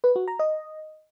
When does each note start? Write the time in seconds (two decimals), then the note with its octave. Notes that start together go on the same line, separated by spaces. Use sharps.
0.04 B4
0.16 F#4
0.28 A#5
0.39 D#5